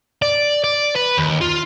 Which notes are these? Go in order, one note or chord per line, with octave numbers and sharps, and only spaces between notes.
D5
D5
B4
D#2
F4